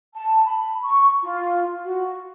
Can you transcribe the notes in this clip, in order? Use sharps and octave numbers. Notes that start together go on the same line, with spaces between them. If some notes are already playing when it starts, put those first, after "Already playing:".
A5
B5
C#6
F4
F#4